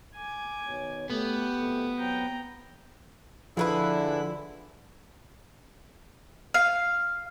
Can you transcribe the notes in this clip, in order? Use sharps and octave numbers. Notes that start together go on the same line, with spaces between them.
G#5 D6
B2 D#3 C#5
A3 B3 G4
F2 B2 A3
F#3 C4 G5 A#5
D3 F3 E4 G#4 A#4 B4
F5